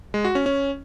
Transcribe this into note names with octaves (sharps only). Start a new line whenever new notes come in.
G#3
F#4
C#4
C#4